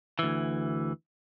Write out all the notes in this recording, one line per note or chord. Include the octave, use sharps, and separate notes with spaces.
D2 E3